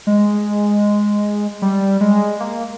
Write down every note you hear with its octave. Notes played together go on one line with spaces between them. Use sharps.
G#3
G3
G#3
A#3